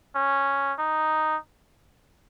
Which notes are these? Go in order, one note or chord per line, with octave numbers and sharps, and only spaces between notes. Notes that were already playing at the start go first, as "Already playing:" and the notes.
C#4
D#4